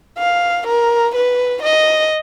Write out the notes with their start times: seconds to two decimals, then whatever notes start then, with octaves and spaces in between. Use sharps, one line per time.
0.18 F5
0.67 A#4
1.15 B4
1.62 D#5